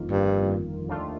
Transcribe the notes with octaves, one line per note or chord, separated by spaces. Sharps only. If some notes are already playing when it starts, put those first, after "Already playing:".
Already playing: G1 F2 D#3 A#3 F4
G2
D#2 D#3 A3 D4 F4